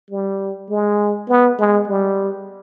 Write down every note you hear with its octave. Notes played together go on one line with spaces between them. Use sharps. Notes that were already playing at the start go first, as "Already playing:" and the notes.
G3
G#3
B3
G#3
G3